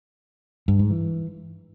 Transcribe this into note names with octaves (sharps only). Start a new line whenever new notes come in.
G2
G#2
E3